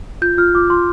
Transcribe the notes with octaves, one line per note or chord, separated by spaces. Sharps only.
F4 G6
F4 F6
F4 D6
F4 C6